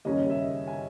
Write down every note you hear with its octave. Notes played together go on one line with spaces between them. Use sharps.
D#2 C#3 G3 C#4 D#5
E5
G#5